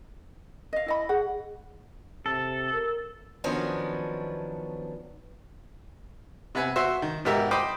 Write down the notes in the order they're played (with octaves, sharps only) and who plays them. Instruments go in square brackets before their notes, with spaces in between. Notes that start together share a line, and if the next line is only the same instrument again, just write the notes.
[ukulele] D#5 F5
E4 D#5 B5
[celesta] G#4 [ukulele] F#5
[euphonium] C3 [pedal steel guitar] A4
[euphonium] A#4
[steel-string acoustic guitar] D#3 F3 F#3 B3 C#4 D4
[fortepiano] C3 B3 B4 G#5
F#4 C5 E5
D#3
G#2 B2 B3 G4 A#4 E5
C5 D#5 G5 B5 D6